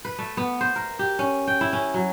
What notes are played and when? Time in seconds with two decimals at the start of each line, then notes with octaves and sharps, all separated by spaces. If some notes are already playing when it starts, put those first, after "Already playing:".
0.05 B4
0.18 A3
0.37 B3
0.61 C5
0.76 A#4
0.99 G4
1.19 C#4
1.47 G5
1.61 E4
1.73 C#4
1.94 F#3